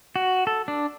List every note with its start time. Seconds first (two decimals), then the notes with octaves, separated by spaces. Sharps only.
0.16 F#4
0.47 A4
0.68 D4